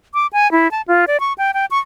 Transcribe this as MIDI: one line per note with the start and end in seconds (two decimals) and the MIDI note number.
0.14 0.27 86
0.33 0.51 80
0.52 0.70 64
0.71 0.82 81
0.88 1.05 65
1.07 1.20 74
1.20 1.33 85
1.38 1.51 79
1.54 1.66 79
1.71 1.78 85